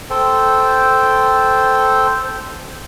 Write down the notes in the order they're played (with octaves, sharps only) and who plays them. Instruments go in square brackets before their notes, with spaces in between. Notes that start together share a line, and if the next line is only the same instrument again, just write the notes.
[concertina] A4 C5 G5